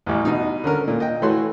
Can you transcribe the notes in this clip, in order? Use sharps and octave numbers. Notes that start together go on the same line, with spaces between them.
A1 E2
B2 D#4
D3 C#4 A#4
A#2
D#5 G5
E3 A3 F#4 C#5 C6